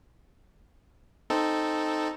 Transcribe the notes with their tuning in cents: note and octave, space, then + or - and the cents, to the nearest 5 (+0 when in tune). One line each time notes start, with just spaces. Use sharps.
C4 +0 D#4 -5 A4 +0